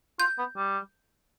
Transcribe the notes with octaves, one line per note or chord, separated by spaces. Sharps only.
F4 G6
B3
G3